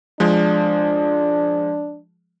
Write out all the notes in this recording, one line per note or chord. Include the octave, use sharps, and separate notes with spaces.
F3 G#3 D4